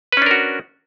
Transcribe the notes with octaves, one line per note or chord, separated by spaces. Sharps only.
C#4 D4 F#4 A#4 B4